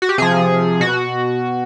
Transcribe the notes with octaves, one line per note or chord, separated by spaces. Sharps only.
F#4
G4
C3 F3 G#4
B2 F#4